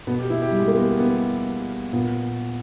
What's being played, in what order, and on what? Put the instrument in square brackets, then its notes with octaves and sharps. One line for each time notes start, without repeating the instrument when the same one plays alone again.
[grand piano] B2 B3
G4
E4
G4
G3
G#3
A#3
B3
B3
A#2 B3